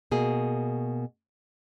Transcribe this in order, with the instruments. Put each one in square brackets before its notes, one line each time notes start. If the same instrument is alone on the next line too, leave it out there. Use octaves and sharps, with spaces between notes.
[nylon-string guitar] B2 A#3 G#4